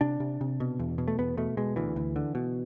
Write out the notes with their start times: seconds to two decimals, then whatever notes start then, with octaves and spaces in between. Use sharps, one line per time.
0.01 C3 D4
0.20 C3
0.41 C3
0.60 B2
0.79 E2
0.98 B2
1.08 A3
1.18 E2 B3
1.37 B2 A3
1.57 B2 G#3
1.76 D2 E3
1.96 D2
2.16 D3
2.35 B2